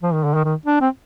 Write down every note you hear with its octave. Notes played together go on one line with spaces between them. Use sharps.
F3
D#3
D3
D#3
D#3
D4
C4